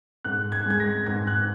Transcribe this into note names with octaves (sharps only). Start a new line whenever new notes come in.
G#2 F#6
G#6
G#3 G#6
A#6
G#2 G#6
F#6